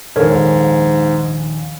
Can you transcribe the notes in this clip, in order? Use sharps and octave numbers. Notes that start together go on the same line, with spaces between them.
A#1 D#2 G#2 A4 A#4 C#5